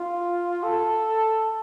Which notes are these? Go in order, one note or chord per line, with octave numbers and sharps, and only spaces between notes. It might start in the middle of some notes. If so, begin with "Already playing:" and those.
Already playing: F4
A4